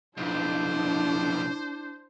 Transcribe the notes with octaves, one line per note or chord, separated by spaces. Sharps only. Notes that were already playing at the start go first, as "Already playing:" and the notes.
B1 F2 D4 E4 C5